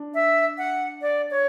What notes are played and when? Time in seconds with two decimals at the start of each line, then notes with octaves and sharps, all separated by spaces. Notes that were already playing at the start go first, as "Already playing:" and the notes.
Already playing: D4
0.14 E5
0.58 F#5
1.01 D5
1.31 C#5